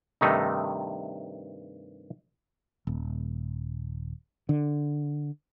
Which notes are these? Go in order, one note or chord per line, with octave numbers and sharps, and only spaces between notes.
G2 C3 D#3 A3 D#4
D#1
D3